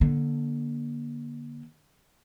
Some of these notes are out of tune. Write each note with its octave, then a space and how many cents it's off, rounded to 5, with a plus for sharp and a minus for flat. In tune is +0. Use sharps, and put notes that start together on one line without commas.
D3 +0 A#3 +30